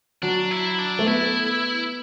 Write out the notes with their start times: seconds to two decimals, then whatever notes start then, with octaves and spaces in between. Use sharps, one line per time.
0.23 F#3 D4
0.51 E4
0.79 D4
0.99 A3
1.07 B3 E4